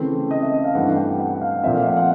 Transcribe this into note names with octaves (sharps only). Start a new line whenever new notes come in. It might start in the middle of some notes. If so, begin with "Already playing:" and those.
Already playing: C#3 E3 A3 C4
D#5
E5
D#5
F5
G2 E3 A3 C4 F#5
G5
F#5
F5
A#2 F3 A3 C4 E5
F5
F#5
F#5